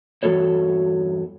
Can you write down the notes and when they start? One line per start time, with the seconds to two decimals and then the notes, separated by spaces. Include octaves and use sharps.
0.23 E2 G2 F#3 F#4 A4 C#5